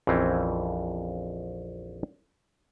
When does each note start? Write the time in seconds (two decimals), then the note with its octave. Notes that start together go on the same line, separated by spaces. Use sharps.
0.07 A#1 F2 E3 C4 C#4